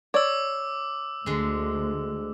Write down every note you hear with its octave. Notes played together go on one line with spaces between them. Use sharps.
C#5 D5 D6 E6
D2 D3 G#3